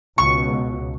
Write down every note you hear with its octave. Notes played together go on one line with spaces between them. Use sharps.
C#2 B2 C#6